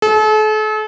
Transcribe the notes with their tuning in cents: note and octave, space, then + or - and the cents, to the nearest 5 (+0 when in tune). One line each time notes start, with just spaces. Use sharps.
A4 -40